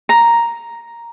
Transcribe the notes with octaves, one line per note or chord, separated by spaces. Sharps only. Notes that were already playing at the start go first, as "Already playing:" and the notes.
A#5